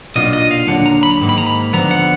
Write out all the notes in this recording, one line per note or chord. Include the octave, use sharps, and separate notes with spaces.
B1 A#2 F#3 D4 F4 D#5
D#5
F5
D#2 D3 F#3 D4 F#5
A#5
B5
G#2 D#3 A#3
B5
A#5
B5
D3 F3 B3 A#5
F#5